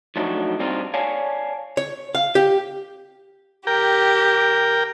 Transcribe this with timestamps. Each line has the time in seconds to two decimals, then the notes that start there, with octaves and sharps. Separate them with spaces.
0.16 F3 F#3 A3 D4 D#4 F#4
0.59 G2 G3 C4 D4 D#4 F4
0.94 C#5 D5 F5 G#5 A5
1.77 C#5
2.15 F5
2.35 G4
3.67 G4 A#4 G5